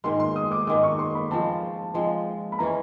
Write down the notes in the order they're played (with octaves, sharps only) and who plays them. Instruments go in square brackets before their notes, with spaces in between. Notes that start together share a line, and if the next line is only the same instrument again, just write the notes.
[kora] G#2 D#3 G#3 [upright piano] C6
[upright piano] C6
D#6
D6
[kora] G#2 D#3 G#3 [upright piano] D6
[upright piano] C#6
C6
B5
[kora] F3 G#3 C4 [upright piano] A5
[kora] F3 G#3 C4
[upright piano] B5
[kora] E3 G#3 C#4 [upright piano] A#5